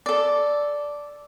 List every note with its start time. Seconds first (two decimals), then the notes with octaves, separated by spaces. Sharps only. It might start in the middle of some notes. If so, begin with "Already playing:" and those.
0.06 A4 D5